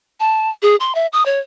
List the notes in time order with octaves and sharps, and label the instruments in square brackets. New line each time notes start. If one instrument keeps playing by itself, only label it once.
[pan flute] A5
G#4
C6
E5
D#6
C#5